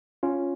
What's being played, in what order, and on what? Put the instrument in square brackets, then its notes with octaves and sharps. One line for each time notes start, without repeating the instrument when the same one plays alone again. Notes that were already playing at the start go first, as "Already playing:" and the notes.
[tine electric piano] C#4 F4